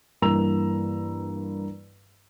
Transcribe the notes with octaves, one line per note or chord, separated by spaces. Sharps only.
G2 E3 A#3 A#5 E6 F7